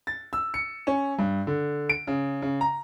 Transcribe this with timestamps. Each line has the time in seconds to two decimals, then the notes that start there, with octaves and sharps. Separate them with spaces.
0.07 A6
0.33 E6
0.54 C#7
0.87 C#4
1.19 G2
1.47 D3
1.90 D7
2.07 C#3
2.42 C#3
2.61 A#5